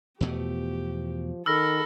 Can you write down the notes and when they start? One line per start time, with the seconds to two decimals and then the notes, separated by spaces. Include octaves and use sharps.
0.21 E2 B2 F3 A3 G4
1.46 D#3 A4 B5 E6 F6 A#6